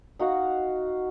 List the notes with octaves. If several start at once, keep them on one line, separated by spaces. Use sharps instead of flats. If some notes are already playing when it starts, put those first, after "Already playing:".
D#4 F#4 F5 F#5